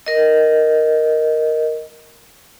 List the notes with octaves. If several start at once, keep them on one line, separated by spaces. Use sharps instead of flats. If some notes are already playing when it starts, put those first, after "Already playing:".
A#4 D#5